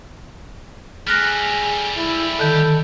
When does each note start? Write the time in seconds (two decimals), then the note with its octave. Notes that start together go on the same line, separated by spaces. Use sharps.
1.07 G3 A3 G#4 F6 F#6 A#6
1.96 E4
2.39 D3 D#3 A4